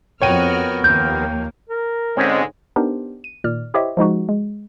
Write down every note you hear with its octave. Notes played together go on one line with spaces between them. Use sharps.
F2 B3 F#4 A#4 C#5 G5 F6 D#7
D#2 F3 A#3 G6
A#4
G#2 D3 G#3 C4 C#4 G#4
B3 D4 D#4 G4 A#4 C5
D#7
A#2 D#3 D5 F6
E4 G4 C5 C#5 D#5 E5
F3 G#3 D#4 F#4
G#3